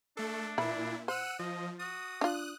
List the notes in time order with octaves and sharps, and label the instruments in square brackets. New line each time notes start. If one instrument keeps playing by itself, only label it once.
[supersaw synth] A3 A4 [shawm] D4
[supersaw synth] A#2 E4 [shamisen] E3 B5
[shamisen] C5 [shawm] F#5 [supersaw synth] E6 F#6 D#7
[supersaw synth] F3 [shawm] D#5
[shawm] F#4 [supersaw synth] D#6
[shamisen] D4 F4 [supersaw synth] D#6 F#6